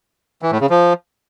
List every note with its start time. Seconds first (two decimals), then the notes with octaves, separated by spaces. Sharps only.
0.42 E3
0.52 A2
0.61 C#3
0.70 F3